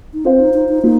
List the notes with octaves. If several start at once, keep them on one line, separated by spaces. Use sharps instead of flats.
D#4
C4 F4 C5 F5
D#4
D#4
D#4
A#3 D#4 F4